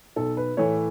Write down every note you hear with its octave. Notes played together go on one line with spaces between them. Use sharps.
B1 A4
B4
A2 E3 A3 C#5